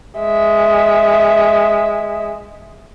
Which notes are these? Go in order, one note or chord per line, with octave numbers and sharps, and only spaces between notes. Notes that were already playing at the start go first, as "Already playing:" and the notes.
G#3 E5